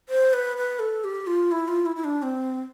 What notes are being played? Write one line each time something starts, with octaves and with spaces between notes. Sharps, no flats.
C5
B4
B4
A4
G4
F4
E4
F4
E4
E4
D4
C4